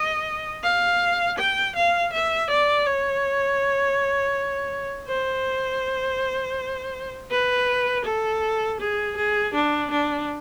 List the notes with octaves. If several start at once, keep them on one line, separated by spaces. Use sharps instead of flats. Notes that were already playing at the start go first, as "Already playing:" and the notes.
Already playing: D#5
F5
G5
F5
E5
D5
C#5
C5
B4
A4
G#4
G#4
D4
D4